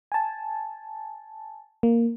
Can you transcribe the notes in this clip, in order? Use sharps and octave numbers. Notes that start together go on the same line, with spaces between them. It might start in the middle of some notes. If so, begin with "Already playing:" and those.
G#5 A5
A#3